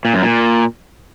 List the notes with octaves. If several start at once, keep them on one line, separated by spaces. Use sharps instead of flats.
A#2
F#2
A#2